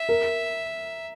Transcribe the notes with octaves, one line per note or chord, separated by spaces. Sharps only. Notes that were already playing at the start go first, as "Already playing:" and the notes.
Already playing: E5
A#4